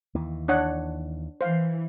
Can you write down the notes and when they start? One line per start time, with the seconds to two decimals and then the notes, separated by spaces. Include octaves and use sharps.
0.15 D#2 E3
0.48 D4 C#5 F#5
1.41 E3 C5 F5